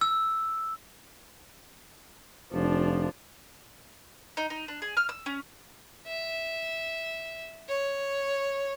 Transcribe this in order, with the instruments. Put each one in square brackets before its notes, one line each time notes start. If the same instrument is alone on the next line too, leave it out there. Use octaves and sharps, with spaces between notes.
[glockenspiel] E6
[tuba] F1 [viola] F3 D4
[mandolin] D#4
D#4
D4
G#4
F6
E6
C#4
[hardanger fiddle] E5
C#5